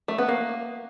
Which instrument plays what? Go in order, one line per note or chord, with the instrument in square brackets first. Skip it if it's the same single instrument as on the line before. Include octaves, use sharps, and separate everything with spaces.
[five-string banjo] A3
B3
A#3